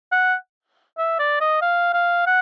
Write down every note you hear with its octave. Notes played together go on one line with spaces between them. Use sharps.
F#5
E5
D5
D#5
F5
F5
F#5